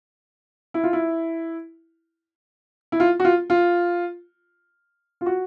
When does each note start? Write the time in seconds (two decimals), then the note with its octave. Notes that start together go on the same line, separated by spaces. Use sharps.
0.74 E4
0.84 F4
0.93 E4
2.92 E4
3.00 F4
3.20 F#4
3.25 F4
3.50 F4
5.21 F4
5.26 F#4